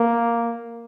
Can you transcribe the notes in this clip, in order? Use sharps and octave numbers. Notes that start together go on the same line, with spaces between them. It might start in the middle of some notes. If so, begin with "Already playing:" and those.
Already playing: A#3